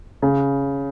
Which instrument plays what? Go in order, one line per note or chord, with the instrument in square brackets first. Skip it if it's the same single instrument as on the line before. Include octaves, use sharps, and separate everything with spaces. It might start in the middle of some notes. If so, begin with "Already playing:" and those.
[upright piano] C#3